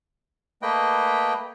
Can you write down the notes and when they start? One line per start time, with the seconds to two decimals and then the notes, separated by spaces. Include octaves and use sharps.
0.62 A3 A#3 B4 D#5 G5